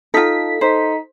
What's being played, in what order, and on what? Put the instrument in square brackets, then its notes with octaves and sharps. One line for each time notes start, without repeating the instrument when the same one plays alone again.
[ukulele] D#4 F4 [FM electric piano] A4 B6
[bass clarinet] D#4 [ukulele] C5